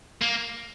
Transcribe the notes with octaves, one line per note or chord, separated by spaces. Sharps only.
A#3